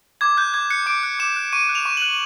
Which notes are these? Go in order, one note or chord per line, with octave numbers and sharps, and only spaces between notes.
D6 G#6
F#6 G6
D6 G#6
F#6 C#7
D6 D7
F#6
D6 E7
F#6
C#6 D#7
F#6
F7
C#6
F#6 F#7